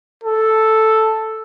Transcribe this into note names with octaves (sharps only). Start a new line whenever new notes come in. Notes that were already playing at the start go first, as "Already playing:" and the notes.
A4